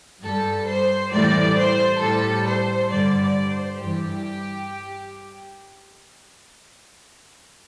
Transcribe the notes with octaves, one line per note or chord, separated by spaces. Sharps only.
G2 G3 A4
C5
A2 E3 G3 D5
C5
A2 G3 A4
C5
G2 D3 G3 D5
D5
C5
G2 E3 G3 G4